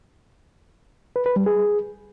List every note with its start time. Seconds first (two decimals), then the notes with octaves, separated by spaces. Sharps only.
1.16 B4
1.26 B4
1.36 G3
1.46 G#4